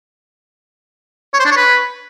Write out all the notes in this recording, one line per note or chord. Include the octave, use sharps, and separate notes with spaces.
C#5
C5
D4
C#5
B4